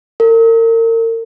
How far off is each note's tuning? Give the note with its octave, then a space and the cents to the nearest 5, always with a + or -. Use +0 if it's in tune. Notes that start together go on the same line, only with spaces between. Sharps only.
A#4 -35